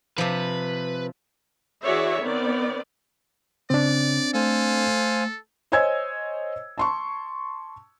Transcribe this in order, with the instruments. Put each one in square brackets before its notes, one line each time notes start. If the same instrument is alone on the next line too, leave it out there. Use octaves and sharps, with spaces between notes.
[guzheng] C3 F3 [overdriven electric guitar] B4
[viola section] E3 F#4 G#4 C#5 D5 E5
D#3 B3 C4 D5
[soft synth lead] C#3 [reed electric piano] C4 D4 [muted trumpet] D5
[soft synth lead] A3 [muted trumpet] A4 [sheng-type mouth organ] C5 F5 G#5
[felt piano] C5 C#5 D#5 G#5 E6 G#6
A5 C6 C#6